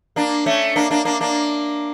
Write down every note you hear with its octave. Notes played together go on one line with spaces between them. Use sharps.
A#3 D4
A3 C#4
A#3 D4
A#3 D4
A#3 D4
A#3 D4